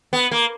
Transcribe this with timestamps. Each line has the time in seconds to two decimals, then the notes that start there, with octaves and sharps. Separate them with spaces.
0.13 B3
0.31 A#3